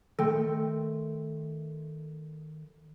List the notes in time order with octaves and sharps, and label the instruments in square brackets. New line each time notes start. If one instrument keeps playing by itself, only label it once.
[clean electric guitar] D#3 C6 [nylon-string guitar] A3 [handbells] A4 G5